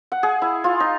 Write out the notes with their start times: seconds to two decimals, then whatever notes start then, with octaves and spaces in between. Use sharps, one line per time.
0.12 F#5
0.23 G#4
0.42 E4
0.64 F4
0.80 D#4